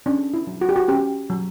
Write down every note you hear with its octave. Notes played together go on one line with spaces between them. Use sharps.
C#4 D4
E4
F#3
F#4
G4
F#4
C#4 G4
F#3